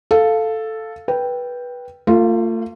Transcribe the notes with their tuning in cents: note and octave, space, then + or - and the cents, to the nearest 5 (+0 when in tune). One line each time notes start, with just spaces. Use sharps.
A4 +0 F5 +0
B4 -15 G5 +0
A3 +40 F4 +0